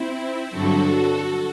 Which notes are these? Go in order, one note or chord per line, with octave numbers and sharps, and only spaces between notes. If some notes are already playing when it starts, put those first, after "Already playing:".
Already playing: C4 E4
G2 D3 F#3 F#4 A4